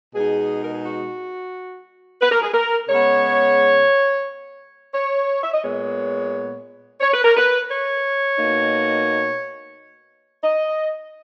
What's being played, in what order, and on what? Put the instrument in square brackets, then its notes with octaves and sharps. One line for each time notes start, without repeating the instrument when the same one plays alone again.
[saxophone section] B2 G#3 D#4 G#4
A#4
G#4
F#4
B4
A#4
G#4
A#4
C#3 G#3 B3 C#5
C#5
E5
D#5
A#2 G#3 B3 C#5
C#5
B4
A#4
B4
C#5
B2 A#3 D#4
D#5